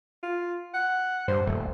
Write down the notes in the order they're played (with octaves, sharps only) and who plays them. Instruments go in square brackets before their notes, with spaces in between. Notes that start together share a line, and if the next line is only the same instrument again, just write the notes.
[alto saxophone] F4
F#5
[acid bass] G2 [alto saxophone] C5
[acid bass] D#1 [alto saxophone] A3